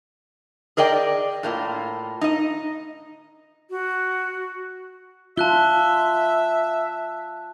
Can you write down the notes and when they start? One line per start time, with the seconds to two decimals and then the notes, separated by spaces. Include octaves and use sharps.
0.77 G#4 A#4 D5 D#5 G5
1.43 A2 A#3 F4
2.21 D#4 D#5
3.70 F#4
5.38 F4 E5 A5 F#6 G7